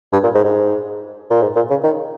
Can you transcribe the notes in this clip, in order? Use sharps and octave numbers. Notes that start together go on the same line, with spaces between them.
G2
A#2
G#2
G#2
A#2
G#2
A#2
C#3
D#3